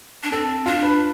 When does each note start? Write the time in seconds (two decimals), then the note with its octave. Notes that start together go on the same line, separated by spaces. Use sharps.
0.23 D4
0.32 C4 A4
0.66 D4 F4
0.83 B4